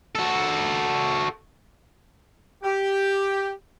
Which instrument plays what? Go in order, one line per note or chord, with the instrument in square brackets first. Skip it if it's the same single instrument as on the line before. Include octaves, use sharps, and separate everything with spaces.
[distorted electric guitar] F#4 A4
[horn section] G4